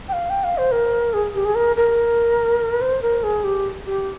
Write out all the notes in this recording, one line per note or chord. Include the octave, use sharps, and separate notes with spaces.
G5
F5
G5
F5
C5
A#4
G#4
G4
G#4
A#4
A#4
C5
A#4
G#4
G4
G4